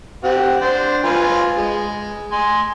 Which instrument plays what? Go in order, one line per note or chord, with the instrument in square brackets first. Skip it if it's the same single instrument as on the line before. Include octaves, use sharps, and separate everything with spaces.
[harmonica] C4 G4 F#5
D4 C5
F4 B4 G#5
G#3
G#5 C6